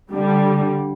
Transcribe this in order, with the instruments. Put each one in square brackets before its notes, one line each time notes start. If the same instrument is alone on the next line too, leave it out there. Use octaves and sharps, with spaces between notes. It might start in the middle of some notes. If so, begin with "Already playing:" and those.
[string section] D3 G3